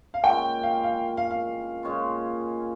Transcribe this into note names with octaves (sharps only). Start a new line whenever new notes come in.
F5
A#2 G#3 C#4 G5
F5
F5
F5
F5
A#2 G#3 C#4 F4